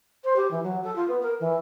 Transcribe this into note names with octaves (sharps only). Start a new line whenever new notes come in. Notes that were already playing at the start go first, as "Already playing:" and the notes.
C5
G4
E3
F#3
A4
F4
B3
A#4
E3